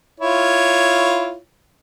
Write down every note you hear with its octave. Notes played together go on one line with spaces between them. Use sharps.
E4 F4 C#5